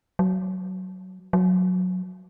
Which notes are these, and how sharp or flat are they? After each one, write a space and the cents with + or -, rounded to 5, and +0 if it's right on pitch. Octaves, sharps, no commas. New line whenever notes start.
F#3 +10
F#3 -15